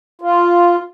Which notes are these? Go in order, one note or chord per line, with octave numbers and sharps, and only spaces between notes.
F4